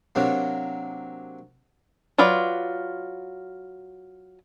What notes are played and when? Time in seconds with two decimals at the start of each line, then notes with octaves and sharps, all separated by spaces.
0.15 C3 F#3 A#3 D4
2.18 F#3 F4 B4 D5